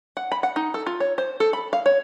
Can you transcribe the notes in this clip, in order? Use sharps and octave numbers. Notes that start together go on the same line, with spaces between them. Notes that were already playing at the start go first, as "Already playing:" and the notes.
F#5
B5
F#5
D#4
A4
F4
C#5
C5
A4
B5
F5
C#5